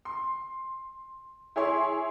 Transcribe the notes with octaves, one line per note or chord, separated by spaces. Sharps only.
C6
E4 G#4 C#5 C6